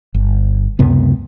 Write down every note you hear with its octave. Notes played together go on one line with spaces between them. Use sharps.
G1
C#2 F#2 C3 B3